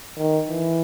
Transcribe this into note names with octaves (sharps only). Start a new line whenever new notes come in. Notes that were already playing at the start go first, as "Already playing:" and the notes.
D#3
E3